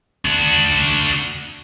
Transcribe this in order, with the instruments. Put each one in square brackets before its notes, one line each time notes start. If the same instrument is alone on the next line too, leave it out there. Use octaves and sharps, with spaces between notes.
[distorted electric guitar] D4 F#4